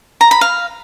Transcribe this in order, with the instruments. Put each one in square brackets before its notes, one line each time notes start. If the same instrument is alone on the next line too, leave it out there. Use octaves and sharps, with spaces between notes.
[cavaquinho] A#5
B5
F5